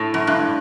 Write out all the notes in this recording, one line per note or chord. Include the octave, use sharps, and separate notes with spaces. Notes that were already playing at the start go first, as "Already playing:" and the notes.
Already playing: A2
F#2
G2